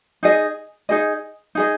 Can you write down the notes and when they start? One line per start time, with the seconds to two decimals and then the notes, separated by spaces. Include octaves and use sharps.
0.23 D#4 G#4 D#5
0.89 D#4 G#4 D#5
1.55 D#4 G#4 D#5